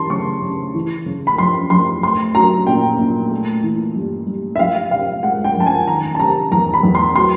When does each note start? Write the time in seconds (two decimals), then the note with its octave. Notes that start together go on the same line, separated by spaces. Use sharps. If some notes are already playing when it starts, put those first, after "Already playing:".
Already playing: E3 G3 A5 C6
0.10 C#3 C#6
0.42 C#3
0.74 E3
1.06 C#3
1.27 B5
1.38 F2 C6
1.70 F2 C6
2.02 A3 C6
2.35 F#3 A#5
2.67 A#2 G5
2.99 A#2
3.31 A3
3.63 E3
3.96 G2
4.27 G2
4.56 E5
4.59 F3 F5
4.91 C3 F5
5.23 G#3 F#5
5.44 G5
5.56 F2 A5
5.66 G#5
5.88 D#3 A#5
6.15 A5
6.20 C3 A#5
6.52 E2 A#5
6.74 B5
6.83 E2
6.95 C6
7.16 F#3 C6